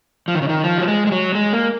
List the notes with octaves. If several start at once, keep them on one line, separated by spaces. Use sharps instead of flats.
F3
D#3
C#3
D#3
F3
F#3
G#3
G#3
F#3
G#3
A#3